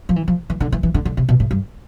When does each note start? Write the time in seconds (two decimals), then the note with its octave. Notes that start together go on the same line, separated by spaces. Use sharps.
0.09 F3
0.16 E3
0.28 F3
0.50 E3
0.60 D3
0.72 E3
0.83 E3
0.94 D3
1.05 D3
1.17 C3
1.29 B2
1.40 A2
1.51 G2